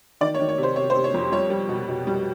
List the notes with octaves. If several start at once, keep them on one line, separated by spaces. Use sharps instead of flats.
D#3 D5
C#5
D#3
C#5
C3
C5
C3 C#5
C5
C3
C#5
F2
G3 C#5
G3
B2
B2
G3